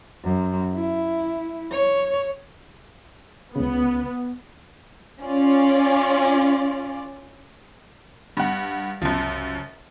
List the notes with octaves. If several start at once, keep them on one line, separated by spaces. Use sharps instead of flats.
F#2
E4
C#5
C#2 C#3 B3
C#4 F4 D5
G2 F#5
C2 F#2 C#3 F3 A5